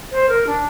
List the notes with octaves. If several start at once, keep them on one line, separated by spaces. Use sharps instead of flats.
C5
A#4
D4